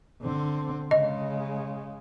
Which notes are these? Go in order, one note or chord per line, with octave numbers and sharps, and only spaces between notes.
D3 C4
C#3 G#3 D#5